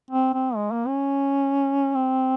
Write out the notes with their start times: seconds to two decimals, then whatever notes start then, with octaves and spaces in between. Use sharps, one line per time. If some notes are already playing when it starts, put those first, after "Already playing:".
0.11 C4
0.34 C4
0.56 G#3
0.72 A#3
0.88 C#4
1.95 C4